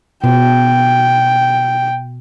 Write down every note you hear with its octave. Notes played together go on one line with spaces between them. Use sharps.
B2 G5